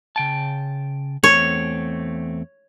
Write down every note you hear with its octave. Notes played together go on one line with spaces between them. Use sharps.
C#3 G5 A5
E2 A3 C4 C#5